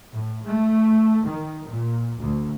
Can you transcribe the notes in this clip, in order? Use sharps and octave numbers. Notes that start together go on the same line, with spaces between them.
A2
A3
D#3
A#2
D2